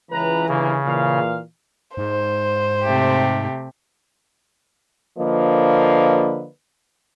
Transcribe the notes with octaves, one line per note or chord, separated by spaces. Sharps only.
C#2 E3 B4 A#5
G1 C#3 A#3
A#2 E3 F5
G#2 C5
C3 A3 G4
D3 F3 A#3 B4 D#5